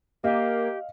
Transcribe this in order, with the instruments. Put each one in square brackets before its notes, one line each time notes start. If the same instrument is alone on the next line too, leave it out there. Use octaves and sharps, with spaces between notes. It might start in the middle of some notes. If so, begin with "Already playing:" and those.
[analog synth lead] A#3 [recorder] G4 [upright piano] D#5 F5